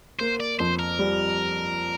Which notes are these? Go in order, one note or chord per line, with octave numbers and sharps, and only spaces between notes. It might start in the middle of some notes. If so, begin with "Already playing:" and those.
A#3 C5
D5
F2 C5
A#4
G3